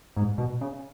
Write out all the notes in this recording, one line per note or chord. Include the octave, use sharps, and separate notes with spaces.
G#2
B2
C#3